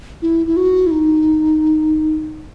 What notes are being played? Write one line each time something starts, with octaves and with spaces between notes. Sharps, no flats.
E4
E4
F#4
E4
D#4